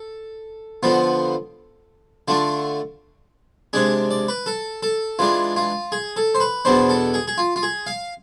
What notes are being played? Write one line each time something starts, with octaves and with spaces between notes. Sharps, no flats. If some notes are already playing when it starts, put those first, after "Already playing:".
Already playing: A4
D3 F3 B3 F4
D3 A3 D4 F4
C3 G#3 D4 G#4
D5
B4
A4
A4
E3 G#3 D4 F4
F4
G#4
A4
C5
B4
E2 B2 B3 D4 C5
A4
G#4
G#4
F4
F4
G#4
F5